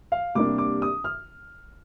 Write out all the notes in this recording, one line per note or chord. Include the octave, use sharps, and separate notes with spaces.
F5
C3 G3 A#3 D4 D6
D6
D#6
F6